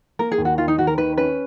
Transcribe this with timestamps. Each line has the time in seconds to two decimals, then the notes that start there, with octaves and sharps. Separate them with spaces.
0.19 A#3 A#4
0.32 G#4
0.38 D#2
0.45 F#4
0.58 D#3 F4
0.68 D#4
0.78 D#2 F#4
0.87 A#4
0.98 D#3 B4
1.18 C#4 B4